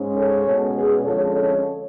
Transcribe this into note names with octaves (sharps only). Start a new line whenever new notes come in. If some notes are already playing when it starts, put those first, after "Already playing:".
Already playing: G#2 G#3 C#4
A4 C#5
B2 G#3 C#4
G#4 B4
F2 D3 F3 G#3 C#4 A4 C#5
A4 C#5